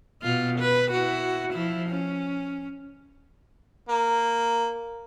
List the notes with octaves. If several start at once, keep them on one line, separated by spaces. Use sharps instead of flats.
B2 F4
B4
E4 F#4
F3 E4
C#4
A#3